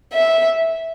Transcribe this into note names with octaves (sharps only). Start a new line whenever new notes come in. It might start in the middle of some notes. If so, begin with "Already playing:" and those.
E5